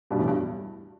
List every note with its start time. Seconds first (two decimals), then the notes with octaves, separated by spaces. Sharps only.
0.11 G2 B2
0.19 E2 A2
0.28 G2